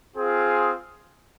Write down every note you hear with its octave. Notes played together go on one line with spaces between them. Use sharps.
C4 F4 G#4